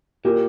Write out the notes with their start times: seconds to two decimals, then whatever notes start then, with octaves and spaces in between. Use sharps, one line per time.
0.25 A#2 G4 A#4